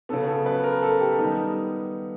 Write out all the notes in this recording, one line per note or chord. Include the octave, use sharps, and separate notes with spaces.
C#3 F#3 B3 A4
A4
B4
A#4
A4
G4
D#3 G3 B3 D#4